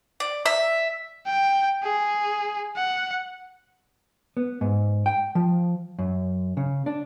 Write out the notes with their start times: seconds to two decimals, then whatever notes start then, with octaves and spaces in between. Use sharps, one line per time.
0.20 D5
0.46 E5
1.26 G5
1.83 G#4
2.76 F#5
4.37 B3
4.61 G#2
5.06 G5
5.35 F3
5.99 F#2
6.57 C#3
6.86 D4